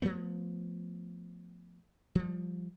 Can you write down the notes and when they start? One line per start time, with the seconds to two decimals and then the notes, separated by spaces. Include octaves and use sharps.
0.02 F3 F#3 A3 B3
2.15 F3 G3